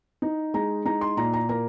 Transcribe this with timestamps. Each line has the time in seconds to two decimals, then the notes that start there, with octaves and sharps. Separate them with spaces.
0.22 D#4
0.54 G#3 A#5
0.86 D#4 A#5
1.01 C6
1.17 A#2 A#5
1.34 A#5
1.49 A#3 A#5